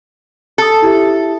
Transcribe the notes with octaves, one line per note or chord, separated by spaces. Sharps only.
A4 A5 D#6
E4 G4 E5